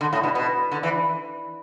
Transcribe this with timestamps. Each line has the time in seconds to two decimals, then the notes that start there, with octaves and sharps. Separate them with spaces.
0.01 D3
0.13 A2
0.23 B2
0.35 B2
0.71 D3
0.83 E3